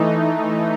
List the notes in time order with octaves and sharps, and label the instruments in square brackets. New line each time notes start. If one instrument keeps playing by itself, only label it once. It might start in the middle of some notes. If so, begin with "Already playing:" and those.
Already playing: [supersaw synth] E3 A3 D#4